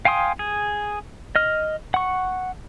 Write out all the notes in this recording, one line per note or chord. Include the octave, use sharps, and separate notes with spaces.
F5 G5 G#5 C6 D#6
G#4
D#5 F6
F#5 C#6